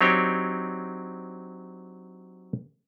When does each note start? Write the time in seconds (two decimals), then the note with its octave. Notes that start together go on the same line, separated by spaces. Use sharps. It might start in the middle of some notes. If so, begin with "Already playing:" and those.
0.01 F#3 C4 D4 D#4 G4 C#5